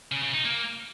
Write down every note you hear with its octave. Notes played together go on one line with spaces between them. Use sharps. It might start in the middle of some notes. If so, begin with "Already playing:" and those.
C#3
C#3
D#4
A#3